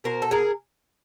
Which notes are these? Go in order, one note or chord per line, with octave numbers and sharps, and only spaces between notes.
B2 A#4 C5
A4
G#4 A#4